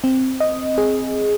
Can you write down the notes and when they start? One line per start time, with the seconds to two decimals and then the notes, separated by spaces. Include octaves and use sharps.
0.04 C4
0.40 D#5
0.78 G#4